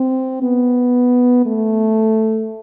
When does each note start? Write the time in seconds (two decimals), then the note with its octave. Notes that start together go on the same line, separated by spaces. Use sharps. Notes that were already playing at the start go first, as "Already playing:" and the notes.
Already playing: C4
0.43 B3
1.46 A3